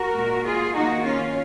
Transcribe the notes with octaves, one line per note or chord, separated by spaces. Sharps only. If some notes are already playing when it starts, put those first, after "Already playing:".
Already playing: F#4 A#4
A#2 G#3
F4 G#4
D#3 A#3 D#4 F#4
C#4 F4